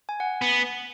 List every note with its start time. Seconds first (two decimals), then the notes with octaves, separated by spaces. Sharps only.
0.09 G#5
0.20 F#5
0.42 B3